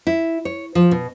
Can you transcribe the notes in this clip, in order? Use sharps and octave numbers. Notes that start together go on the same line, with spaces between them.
E4
C#5
F3
B2